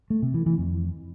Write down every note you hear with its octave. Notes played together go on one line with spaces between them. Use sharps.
A3
C3
E3
E3
F2